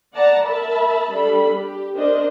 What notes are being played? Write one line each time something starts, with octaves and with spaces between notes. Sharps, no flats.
D5 F#5 A5 A#5
A#4 E5 A5 B5
G3 D4 A4 B5
G4
D4 A#4 C5 D#5